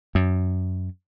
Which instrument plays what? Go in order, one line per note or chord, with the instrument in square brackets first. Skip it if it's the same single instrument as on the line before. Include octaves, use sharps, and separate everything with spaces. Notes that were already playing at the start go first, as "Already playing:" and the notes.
[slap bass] F#2